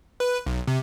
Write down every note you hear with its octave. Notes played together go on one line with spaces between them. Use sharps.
B4
B1
C3